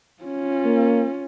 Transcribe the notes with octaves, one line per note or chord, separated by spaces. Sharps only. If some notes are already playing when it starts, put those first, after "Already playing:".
C#4 F4
A#3